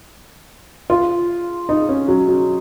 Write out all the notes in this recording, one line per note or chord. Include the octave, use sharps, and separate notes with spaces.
F4
D#4
C#4
F#3
F#3